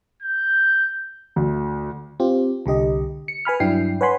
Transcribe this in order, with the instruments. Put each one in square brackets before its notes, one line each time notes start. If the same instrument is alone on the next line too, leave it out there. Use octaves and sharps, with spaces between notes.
[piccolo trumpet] G6
[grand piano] D2
[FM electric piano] C4 F4 G4
C2 D3 G4 D#5
C#7
B4 G#5 B5 F6
G2 F#3 D4 E4 G5 C7
B4 C#5 F#5 G#5 B5 C6